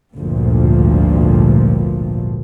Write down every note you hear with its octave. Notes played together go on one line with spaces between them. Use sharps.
G#1 D2 G2 A#2 F3